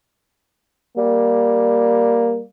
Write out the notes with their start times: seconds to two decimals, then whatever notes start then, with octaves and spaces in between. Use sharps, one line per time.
0.98 G3 A#3